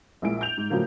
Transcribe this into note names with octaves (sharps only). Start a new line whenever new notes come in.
A#1 A#2 G#3 E4 D7
G6 F7
G#2
A2 C#3 F3 F#3 A#3